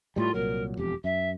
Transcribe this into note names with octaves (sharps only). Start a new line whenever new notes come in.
A2 G3 F4
C2 A#2 F#3 A#4
E1 F2 G4
F#2 E5